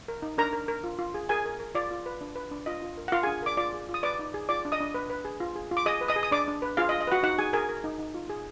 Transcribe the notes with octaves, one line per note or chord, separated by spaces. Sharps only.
A#4
D#4
D4 A#4 A#5
A#4
A#4
F4
F4
G#4
G#4 A#4 G#5
A#4
A#4
F4 D5
F4
B4
D4
B4
D4
F4 D#5
F4
A#4
F#5
F4 A#4 F5
G#4 G#5
D4
A#4 D5 D6
F4 D5 D6
G#4
F4
D#6
B4 D5 D6
D#4
G#4
F4 D5 D6
D4
D#5 D#6
D4
B4
B4
G#4
F4
G#4
F4
D6
G#4 D#5 D#6
B4
D#5 D#6
G#4
D#6
D4 D5 D6
D4
B4
F4 G#4 F5
D#5
F4
D#5
F#4 B4 F#5
D#4 F#4 F#5
D#4 G#4 G#5
G#4 A#4 G#5
A#4
D#4
D#4
F4
G#4